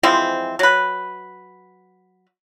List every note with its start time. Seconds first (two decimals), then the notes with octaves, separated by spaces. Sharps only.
0.03 E3 F3 G#3 C4
0.59 F#3 B4